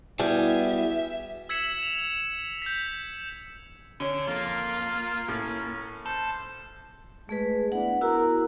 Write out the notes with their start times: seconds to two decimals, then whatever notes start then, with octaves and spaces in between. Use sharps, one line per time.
0.19 G3 B3 E4 F#4 G#4 E5
1.49 E6 G#6 B6 C#7 E7 F#7
1.80 E7 F7
2.62 G6 B6
4.00 D3 C#4 C#5
4.27 F2 A#3 F4
5.28 A2 C#4
6.06 A4 C5
7.29 G#3 A3 G#4 B4
7.72 B3 D4 E4 F#5
8.01 B3 E4 F#4 A#4 E6